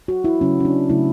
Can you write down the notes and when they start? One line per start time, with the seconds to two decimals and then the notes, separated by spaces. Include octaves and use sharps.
0.08 F#4
0.24 E4
0.40 C#3 F#3 A3 C#4
0.60 C#4
0.65 D4
0.89 C#3 F#3 A3 E4